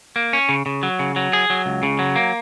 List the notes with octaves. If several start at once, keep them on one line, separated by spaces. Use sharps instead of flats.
A#3
C#4
C#3
C#3
F#3
C#3
F#3
G#4
F#3
C#2
C#3
F#3
A#3